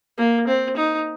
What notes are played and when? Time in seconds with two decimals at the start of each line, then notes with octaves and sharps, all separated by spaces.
0.18 A#3
0.47 C4
0.76 D#4